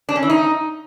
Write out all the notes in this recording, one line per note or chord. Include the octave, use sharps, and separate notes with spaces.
D4
C#4
E3
D#4